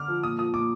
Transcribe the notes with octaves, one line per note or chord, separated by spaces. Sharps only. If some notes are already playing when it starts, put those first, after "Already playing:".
Already playing: D3 D6 F6
F3
A#2 D#6
F3 D#6
A#2 D6